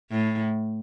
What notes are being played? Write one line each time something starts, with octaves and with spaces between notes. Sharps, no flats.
A2